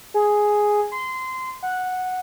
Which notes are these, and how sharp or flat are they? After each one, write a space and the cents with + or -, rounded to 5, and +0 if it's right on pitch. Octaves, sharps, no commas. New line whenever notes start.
G#4 +0
C6 -20
F#5 -5